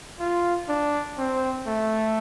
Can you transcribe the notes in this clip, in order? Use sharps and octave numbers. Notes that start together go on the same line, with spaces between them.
F4
D4
C4
A3